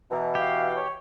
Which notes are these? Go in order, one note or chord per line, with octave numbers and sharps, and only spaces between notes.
B2 E3 A#5
G4 F5
C#5